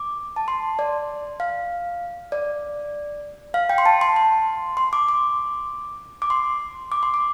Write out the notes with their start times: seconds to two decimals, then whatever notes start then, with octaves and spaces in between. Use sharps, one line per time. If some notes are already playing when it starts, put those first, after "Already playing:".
Already playing: D6
0.36 A5
0.48 C6
0.79 D5
1.40 F5
2.32 D5
3.54 F5
3.69 G5
3.78 C6
3.86 A5
4.01 C6
4.16 C6
4.77 C6
4.93 D6
5.09 D6
6.22 D6
6.30 C6
6.92 D6
7.03 C6
7.14 D6